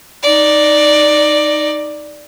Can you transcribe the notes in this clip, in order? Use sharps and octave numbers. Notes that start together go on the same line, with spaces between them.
D#4 D5